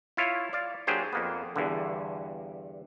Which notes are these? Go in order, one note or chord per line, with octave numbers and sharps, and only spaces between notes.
E4 F4 C#5 F5
D5 F5
F#3 A#3 D4 G4 G#4 C5
F2 A#3 B3
E2 G2 D3